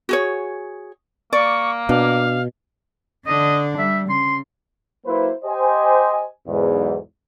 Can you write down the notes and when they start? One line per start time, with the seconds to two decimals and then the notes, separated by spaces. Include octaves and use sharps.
0.09 F#4 G#4 C#5
1.33 A#3 D5 C#6
1.89 B2 D4 F5
3.27 D3 D4 D#5
3.78 G3 E5
4.09 C#3 C6
5.06 F#3 A#3 E4 B4 C5
5.45 G4 C5 D#5 G#5
6.47 B1 E2 G#2